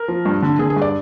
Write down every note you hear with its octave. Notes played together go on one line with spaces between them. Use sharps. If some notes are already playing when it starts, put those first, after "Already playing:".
Already playing: A#4
F3
G2
D3
D3 G#4
G#4
G2
D5